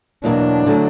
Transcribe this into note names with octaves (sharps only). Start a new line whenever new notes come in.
E2 B2 F#3 A#3 D4
D3 F#3 A3